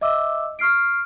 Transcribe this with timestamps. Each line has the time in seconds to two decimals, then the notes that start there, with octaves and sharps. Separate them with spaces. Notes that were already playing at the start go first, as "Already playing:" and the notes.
0.01 D#5 E5 D6 E6
0.59 C#6 F6 C7 D7